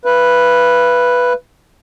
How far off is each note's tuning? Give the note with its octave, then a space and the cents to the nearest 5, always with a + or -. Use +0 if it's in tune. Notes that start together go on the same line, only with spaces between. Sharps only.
B4 +0 F5 -45